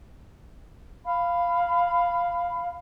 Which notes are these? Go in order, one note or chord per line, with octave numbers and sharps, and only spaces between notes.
F5 B5